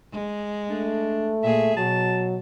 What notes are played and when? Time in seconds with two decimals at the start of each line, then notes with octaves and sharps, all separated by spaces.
0.13 G#3
0.70 A3 D4
1.43 A#2 G#4 E5
1.77 B2 F#3 A5